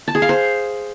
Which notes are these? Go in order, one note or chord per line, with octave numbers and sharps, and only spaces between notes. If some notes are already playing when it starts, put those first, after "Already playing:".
A5
G#4
F5
C5